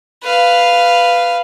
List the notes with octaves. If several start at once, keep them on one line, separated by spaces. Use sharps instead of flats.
B4 F5